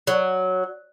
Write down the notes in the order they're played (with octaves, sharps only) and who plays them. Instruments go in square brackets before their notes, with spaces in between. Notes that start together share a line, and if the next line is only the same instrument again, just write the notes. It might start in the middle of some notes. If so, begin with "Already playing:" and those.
[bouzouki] F#3